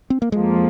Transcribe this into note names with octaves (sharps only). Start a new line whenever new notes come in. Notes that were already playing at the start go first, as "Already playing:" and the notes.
C4
A#3
F2 F3 G#3 A#3